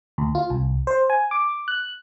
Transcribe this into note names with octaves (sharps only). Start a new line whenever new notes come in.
D2
F4
C2
C5
G#5
D6
F#6